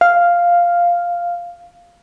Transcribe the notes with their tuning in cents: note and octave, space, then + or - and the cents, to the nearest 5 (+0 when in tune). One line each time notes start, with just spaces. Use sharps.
F5 +0